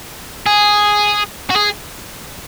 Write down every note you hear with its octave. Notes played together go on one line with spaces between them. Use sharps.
G#4
F#4
G#4